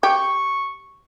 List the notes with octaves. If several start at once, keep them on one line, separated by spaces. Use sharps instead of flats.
G4 C#6